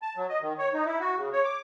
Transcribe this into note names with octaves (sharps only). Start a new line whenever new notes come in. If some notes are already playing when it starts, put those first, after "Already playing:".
A5
F#3
D#5
D#3
C#5
D#4
E4
F#4
C#3
C#5
D6